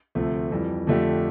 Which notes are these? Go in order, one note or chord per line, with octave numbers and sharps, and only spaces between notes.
D2 C3 F3 A3
F2 E3 G3
F2 D3 A3 D4 G4